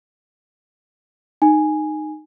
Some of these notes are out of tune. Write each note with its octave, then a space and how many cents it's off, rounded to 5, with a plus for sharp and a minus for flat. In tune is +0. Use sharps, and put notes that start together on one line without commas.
D#4 -15 G#5 +0